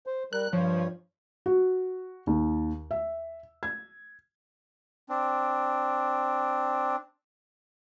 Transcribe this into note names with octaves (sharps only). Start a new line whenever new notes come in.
C5
G3 A#4 F#6
G2 F3 C#5
F#4
D#2
E5
G#6
C4 D4